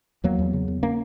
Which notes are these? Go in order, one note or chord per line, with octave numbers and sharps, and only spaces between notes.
E2 F#3 A#3
E2
C#3
E2
A#3 C#4